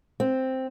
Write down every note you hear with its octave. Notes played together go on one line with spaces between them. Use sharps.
C4